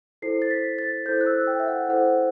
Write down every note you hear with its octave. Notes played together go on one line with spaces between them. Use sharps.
E4 A4 C5 C7
A6
B6
A6
E4 A4 C5 G6
F#6
E6
G5
E5
F#5
E4 A4 C5 F#5